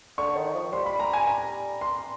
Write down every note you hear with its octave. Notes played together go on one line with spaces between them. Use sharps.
D3 C#6
D#3
F3
G3 C6
B5
A#5
G#5
A#5
C6